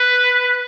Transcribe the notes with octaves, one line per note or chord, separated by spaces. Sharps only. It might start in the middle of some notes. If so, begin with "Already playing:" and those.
Already playing: B4